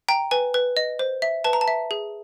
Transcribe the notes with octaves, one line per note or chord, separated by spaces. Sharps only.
G5 A#5
B4 G#5
B4
D#5
C5
E5
B4 A5
A#5
A5
E5
G#4